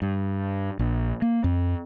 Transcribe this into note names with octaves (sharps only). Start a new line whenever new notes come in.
G2
A#1
A#3
F2